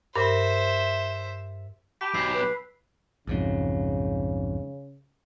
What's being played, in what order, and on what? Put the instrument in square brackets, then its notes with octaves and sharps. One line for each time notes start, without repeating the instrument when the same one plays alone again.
[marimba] G2 A#4 [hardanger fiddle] C5 E5
[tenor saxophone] G4 [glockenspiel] A5 B5 B6
[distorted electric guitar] B1 [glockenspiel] B5 E6 C7
[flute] B4
[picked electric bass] B1 F2 G#2 [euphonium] C#3